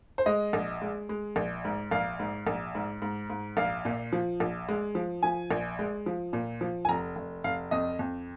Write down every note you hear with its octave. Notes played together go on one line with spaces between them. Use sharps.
C5
G#3 D#5
A#1
G#3
G#3
A#1
G#2
A#1 F5
G#2
A#1
G#2
G#2
G#2
A#1 F5
A#2
F3
A#1
G#3
F3
F3 G#5
A#1
G#3
F3
A#2
F3
G#5
F1 A#5
F1
F1 F5
F2 D#5
F2